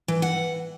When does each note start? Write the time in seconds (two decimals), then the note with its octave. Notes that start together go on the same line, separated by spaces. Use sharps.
0.08 E3
0.22 F#5